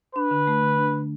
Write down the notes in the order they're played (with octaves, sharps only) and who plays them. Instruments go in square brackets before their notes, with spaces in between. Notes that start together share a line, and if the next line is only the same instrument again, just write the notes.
[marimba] D4 [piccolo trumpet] B4
[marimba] D3
A3
D3
D4
D3